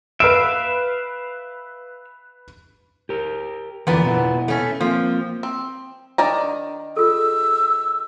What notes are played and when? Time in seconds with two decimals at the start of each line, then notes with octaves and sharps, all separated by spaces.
0.20 B4 E5 F5 D7
3.09 G4 A#4
3.87 F2 A#2 D3 E3 B3
4.04 B2 E4
4.48 A3 C#4
4.81 F3 A#3 C4
5.43 C4
6.18 D#3 D4 D5 A#5
6.96 F4 G#4 A4 E6